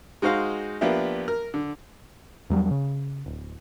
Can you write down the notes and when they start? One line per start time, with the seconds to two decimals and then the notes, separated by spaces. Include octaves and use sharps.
0.22 G#3 D#4 F#4 C5 F5
0.81 F3 A#3 B3 D4 G4 E5
1.28 A#4
1.54 D3
2.50 E2 F#3 G3
2.71 C#3
3.26 D1